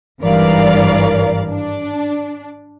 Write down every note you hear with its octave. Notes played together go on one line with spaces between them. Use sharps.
G#1 G2 E3 A#4 D5 F5
D4